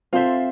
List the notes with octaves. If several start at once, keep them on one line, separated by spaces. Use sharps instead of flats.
C4 F4 A4 C5 E5